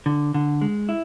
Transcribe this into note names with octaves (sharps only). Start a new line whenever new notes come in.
D3
D3
G#3
E4